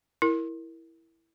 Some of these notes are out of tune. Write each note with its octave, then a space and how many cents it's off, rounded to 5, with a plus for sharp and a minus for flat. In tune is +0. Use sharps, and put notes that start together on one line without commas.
E4 +0 A#4 +0